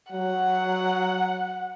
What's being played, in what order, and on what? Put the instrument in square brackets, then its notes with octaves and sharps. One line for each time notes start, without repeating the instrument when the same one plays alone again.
[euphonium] F#3 [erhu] F#5